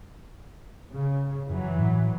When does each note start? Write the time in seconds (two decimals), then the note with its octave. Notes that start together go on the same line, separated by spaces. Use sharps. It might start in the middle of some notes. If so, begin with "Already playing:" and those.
0.93 C#3
1.50 F#2 E3 F#3
1.79 A2